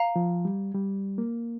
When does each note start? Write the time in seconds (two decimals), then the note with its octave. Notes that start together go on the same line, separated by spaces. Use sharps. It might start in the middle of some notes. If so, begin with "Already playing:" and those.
Already playing: F5 A#5
0.16 F3
0.45 G3
0.75 G3
1.18 A#3